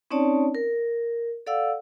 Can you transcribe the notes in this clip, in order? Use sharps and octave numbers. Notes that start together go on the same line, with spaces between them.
C4 C#4 D#4 C#5 D5 A5
A#4
A4 D5 F5 F#5 E6